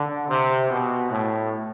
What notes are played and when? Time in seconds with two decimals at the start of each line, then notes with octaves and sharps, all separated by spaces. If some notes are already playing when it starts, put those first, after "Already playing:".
Already playing: D3
0.28 C3
0.70 B2
1.11 A2